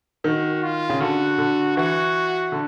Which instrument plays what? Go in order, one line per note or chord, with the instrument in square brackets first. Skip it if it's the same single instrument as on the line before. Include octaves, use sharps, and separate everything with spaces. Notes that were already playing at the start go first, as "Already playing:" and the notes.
[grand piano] D#3 [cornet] F#4
[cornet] F4
[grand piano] C#3
[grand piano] D3 [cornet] F#4
[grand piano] D3
[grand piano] E3 [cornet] F#4
[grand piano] D3